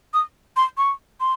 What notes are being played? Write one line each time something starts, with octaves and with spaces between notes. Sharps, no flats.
D#6
C6
C#6
C6